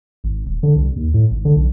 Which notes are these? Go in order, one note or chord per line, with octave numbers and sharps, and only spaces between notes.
G#1
D#1
D3
C2
D#2
A2
G#1
D3
B1